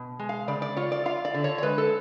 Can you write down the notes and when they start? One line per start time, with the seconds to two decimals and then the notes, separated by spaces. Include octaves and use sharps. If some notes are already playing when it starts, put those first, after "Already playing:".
Already playing: B2
0.19 G#3
0.29 F5
0.48 C#3 D5
0.62 D5
0.77 F4 C#5
0.92 D5
1.06 F4 F5
1.25 D5
1.34 D3
1.44 C#5
1.58 C#5
1.63 G#3 B4
1.78 A4